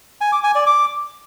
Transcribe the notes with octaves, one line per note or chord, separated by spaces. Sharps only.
G#5
D6
G#5
D5
D6